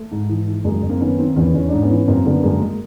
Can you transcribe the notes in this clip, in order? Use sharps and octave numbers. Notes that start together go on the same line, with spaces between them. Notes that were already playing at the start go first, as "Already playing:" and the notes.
Already playing: A3
G#2
E3
E3
F#2 G#3 A#3
F#2
A#3 C4
D#3 B3 C#4
D#3 A#3 C4
E2 B3 C#4
E2 C#4
G#2 D4
B3 C#4
E3
F#2 A#3 C4
D3 A3 B3
F#2 G#3 A#3
G#3